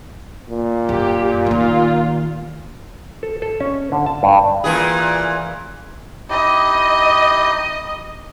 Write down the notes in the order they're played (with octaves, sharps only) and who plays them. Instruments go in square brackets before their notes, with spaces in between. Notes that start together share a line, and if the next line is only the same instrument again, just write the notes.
[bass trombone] A#2
[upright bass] F#2 [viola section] G4
[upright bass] D#3 A#3 [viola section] F4
[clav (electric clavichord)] A4
A4
C#4
D3
A5
G2
[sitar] A#2 E3 G#4
[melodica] D#4 E4 G4 [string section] D#5